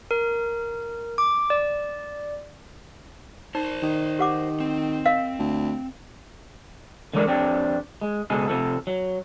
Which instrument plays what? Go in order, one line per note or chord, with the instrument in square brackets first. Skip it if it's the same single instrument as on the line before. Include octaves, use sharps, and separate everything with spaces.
[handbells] A#4
D6
D5
[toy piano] D#4 [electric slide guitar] A#4 C5
[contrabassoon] D#3
[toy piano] G4 F#5 D6
[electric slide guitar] C4
[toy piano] A#4 D#5 F5
[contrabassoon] D2
[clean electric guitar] D3 E3 G#3 A#4 D5
F2 C4 D4 G4
G#3
C#2 B2 G#3 G#4 A4
C3 F3 A4
F#3